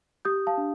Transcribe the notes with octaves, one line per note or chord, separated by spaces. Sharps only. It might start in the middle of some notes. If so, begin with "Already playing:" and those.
G4 D#6 G6
F5 A5
D4